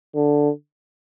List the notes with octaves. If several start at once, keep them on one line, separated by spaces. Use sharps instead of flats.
D3